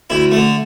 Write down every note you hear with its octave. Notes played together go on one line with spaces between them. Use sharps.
D2 E4
D3 A3